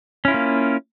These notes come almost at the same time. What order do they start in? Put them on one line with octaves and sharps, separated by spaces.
C#4 E4 F4 A#3